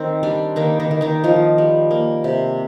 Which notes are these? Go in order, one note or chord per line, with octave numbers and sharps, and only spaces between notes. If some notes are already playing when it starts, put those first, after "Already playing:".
Already playing: D#3 C4 D#4
G3 D4
D#3 A#3 D#4
D#3 D#4
D#3
D#3 D#4
D#3 F3 F4
G3
A#3
C3